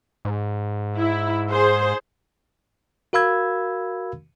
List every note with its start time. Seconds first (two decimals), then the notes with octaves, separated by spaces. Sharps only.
0.25 G#2
0.95 E4
1.50 G#4 C5
3.13 F#4 A#4 F5 B5 E6 G#6